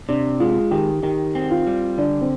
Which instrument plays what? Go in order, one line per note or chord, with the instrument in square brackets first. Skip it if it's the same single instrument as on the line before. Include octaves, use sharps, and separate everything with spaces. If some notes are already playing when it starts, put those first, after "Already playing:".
[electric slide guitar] C3 [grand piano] D4
[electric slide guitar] G#3 [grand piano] F4
[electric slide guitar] D#3 [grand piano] G4
[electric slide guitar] D#3 [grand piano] G4
[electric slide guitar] C4
[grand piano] F4
[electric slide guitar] G3
[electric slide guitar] D3 [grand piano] D4
[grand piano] C4